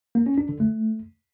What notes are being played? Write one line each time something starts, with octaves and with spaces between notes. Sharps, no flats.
A#3
C#4
D4
D3
A3